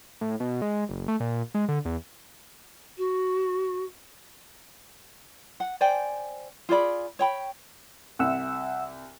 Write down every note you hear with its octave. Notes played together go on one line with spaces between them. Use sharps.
A2
B2
G#3
F#1
A3
A#2
G#3
D3
E2
F#4
F#5
C5 D5 G5 G#5
F4 G#4 D5 B5
C#5 G5 B5
C2 E5 F#5 E6